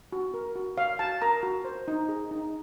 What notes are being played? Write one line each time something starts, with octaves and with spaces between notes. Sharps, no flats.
F#4
A#4
F#4
C#5 F5
F#4 A5
A#4 A#5
F#4
C5
D#4
G#4
D#4